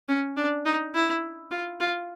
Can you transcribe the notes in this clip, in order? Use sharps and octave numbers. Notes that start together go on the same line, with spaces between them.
C#4
D4
D#4
E4
F4
F4